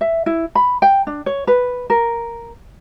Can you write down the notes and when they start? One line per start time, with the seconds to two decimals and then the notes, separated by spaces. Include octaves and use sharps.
0.01 E5
0.26 E4
0.55 B5
0.82 G5
1.07 D4
1.26 C#5
1.47 B4
1.90 A#4